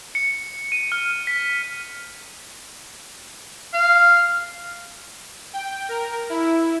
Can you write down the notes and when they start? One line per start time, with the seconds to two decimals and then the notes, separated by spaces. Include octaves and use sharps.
0.15 C#7
0.72 D#7
0.92 F6
1.27 B6
3.74 F5
5.53 G5
5.89 A#4
6.30 E4